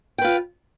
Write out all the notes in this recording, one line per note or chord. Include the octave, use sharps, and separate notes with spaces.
F4 B4 G5